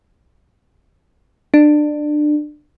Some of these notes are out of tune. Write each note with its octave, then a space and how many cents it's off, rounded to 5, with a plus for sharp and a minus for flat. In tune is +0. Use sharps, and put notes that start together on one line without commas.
D4 +25